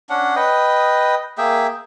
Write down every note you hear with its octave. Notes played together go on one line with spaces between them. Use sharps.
C#4 D4 F#5
B4 D#5 G5 D#6
A#3 G#4 E5 G5